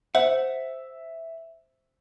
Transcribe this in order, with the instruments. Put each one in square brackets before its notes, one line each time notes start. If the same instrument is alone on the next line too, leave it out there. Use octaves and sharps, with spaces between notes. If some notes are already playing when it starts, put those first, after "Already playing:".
[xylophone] C5 [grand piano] E5 [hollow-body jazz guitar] F#5